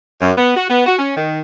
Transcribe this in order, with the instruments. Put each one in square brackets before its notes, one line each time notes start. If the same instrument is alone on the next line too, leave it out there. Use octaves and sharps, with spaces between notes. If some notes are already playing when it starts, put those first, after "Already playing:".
[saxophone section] F#2
B3
F#4
B3
F#4
C#4
D#3